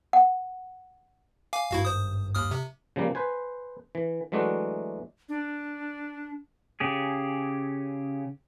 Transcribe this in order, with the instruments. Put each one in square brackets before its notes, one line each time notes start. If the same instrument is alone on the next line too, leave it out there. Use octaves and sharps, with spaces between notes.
[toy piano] F#5
[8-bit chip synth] F5 G#5 D6
[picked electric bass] G#1 G2 [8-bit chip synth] E4 F#4 F5
[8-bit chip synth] C5 D#6
D#2 D#6 F6
C3
[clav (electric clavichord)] C#3 F3 G3 A#3
B4 C5 G#5
E3
E3 F#3 G#3 A3 D4 F#4
[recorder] D4
[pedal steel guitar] C#3 G4 G#4